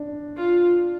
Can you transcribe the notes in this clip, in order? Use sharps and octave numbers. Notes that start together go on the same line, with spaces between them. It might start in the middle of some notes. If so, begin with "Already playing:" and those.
Already playing: D4
F4